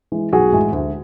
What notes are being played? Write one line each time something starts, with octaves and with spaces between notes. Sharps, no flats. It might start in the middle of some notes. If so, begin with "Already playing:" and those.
E3 G#3
B1 F#4 G#4
A2 E3 G#3
D2